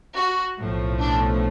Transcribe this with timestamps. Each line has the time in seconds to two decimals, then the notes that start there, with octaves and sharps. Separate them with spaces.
0.16 F#4
0.59 B1 A2 F3 A3
1.00 D4